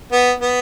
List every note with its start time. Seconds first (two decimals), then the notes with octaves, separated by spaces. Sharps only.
0.12 B3
0.40 B3